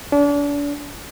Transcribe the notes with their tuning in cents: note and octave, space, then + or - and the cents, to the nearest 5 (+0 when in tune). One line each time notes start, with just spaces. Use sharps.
D4 -35